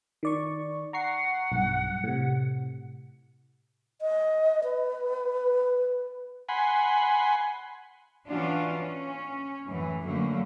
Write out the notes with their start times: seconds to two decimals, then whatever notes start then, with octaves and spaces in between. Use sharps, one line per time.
0.23 D#3 D5 C#6
0.93 F#5 A#5 C#6 C7
1.52 B1 G2
2.04 A2 C3
4.01 D#5
4.64 B4
6.49 F#5 G#5 B5 C6
8.27 E3 C#4 D4 F4 F#4
8.74 C#4
9.68 F#2 A2 E3
10.04 F#2 D3 F#3 A3 A#3